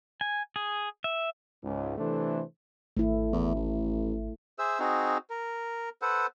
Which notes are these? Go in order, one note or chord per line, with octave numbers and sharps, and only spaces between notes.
G#5
G#4
E5
C#2 G#2
C3 E3 A3 D4 A4 C5
G#1 A3 E4
E2
A1
G#4 C5 E5 E6
C4 D#4 F#4 G#4
A#4
A4 B4 C5 F#5